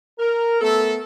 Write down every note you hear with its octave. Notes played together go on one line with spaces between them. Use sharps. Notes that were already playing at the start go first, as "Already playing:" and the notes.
A#4
A3 B3 A4